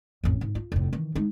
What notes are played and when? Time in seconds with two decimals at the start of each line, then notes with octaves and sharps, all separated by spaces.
0.24 A1 F2
0.41 G#2
0.55 F4
0.72 F1 A2
0.93 D#3 E3
1.15 G#3 D#4